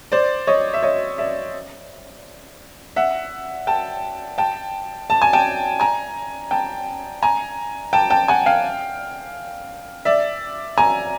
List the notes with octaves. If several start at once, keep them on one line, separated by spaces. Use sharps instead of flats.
C5 D5
C#5 D#5
E5
C#5 D#5
D5 E5
E5 F#5
G5 A5
G5 A5
A5
G#5
G5 A5
G#5 A#5
G5 A5
G#5 A#5
G5 A5
G5 A5
F#5 G#5
F5 G5
D5 E5
G#5 A#5